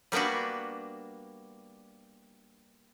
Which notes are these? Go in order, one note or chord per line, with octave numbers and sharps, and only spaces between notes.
G3 A#3 B3 D4 F#4